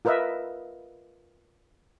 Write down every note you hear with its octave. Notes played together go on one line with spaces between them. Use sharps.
F4 A#4 B4 D#5 E5